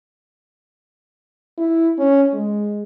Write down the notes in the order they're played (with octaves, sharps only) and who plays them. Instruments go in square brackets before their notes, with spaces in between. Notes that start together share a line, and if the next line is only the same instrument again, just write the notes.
[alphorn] E4
C#4
G#3